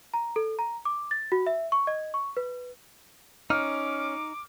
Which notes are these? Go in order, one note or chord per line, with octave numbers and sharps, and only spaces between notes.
A#5
A4
A#5
D6
A6
F#4
E5
C#6
D#5
C#6
B4
C#4 D#4 D6 F6